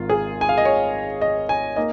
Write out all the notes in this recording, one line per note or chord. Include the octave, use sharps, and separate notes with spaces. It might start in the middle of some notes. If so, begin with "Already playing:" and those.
Already playing: G#1 G#2 D#3 F4
G#4
G#5
F5
D#5
C#5
D#5
G#5
A#3 D#4 D#5